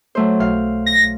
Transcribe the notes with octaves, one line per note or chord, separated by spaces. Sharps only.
F#3 A3 C5
B1 F5
A#6